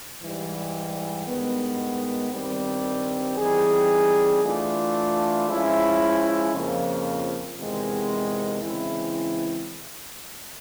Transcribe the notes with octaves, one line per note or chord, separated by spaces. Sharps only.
G#2 E3 G3
G2 D#3 G#3 B3
G2 D#3 G3 C4
E3 G3 C4 D#4 G#4
E3 A3 D4 F4
F3 G#3 C#4 E4
F2 C#3 F3 A#3
E2 C3 D#3 G#3 C4
C#3 E3 G#3 C4 E4